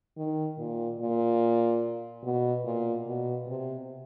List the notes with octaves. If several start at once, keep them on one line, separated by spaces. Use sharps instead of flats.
D#3
A#2
A#2
B2
A#2
B2
C3